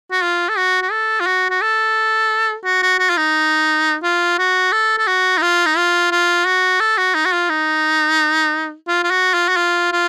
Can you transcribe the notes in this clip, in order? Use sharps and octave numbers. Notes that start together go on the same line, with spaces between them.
F#4
F4
A4
F#4
F#4
A4
F4
F#4
F#4
A4
F#4
F#4
F#4
F4
D#4
F4
F#4
A4
A4
F#4
D#4
F4
D#4
F4
F4
F#4
A4
F#4
D#4
F#4
F4
D#4
F4
F4
F#4
F4
F#4
F4
F4